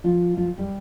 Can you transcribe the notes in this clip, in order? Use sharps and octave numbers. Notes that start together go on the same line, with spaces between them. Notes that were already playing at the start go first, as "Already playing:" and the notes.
F3 F4
F3 F4
G3 G4